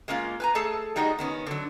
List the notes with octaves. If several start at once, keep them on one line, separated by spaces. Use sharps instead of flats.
G#3 A#3 C#4 E4 F4
B4 G#5 A#5
A3 G#4 A4 A5
G3 G#3 D#4 F#4 G#4
D#3 B3 C#4
D3 F#3